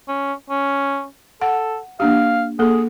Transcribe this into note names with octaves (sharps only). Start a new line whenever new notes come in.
C#4
C#4
A4 F#5
A#3 D4 G4 F5
A#3 G#4 A4